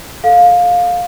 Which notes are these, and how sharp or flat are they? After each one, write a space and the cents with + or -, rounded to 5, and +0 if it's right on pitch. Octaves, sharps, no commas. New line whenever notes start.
A4 +0 F5 +15